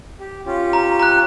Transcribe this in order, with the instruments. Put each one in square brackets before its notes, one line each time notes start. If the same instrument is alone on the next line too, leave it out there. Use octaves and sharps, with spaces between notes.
[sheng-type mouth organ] G4
C#4 F4 G4
[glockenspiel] A#5
A#5 F#6